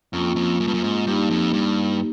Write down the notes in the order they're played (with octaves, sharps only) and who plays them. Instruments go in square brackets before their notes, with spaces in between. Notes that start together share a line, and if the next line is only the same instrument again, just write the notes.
[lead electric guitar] F2 [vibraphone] A#3 C#4 F4
[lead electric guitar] F2
F#2
G2
F#2
G#2
[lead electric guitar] G2 [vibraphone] A#3 D#4 G4
[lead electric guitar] F2
G2